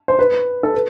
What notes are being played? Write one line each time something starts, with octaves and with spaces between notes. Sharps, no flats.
C5
B4
A4
B4